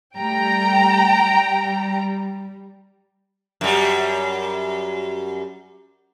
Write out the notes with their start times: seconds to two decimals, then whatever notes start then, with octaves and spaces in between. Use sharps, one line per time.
0.18 G3 A3 G5 A#5
1.16 G3
3.61 F#2 G3